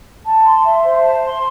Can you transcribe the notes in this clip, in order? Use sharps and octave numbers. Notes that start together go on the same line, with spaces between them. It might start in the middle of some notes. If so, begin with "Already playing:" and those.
A5
C6
E5
C5
A5
C6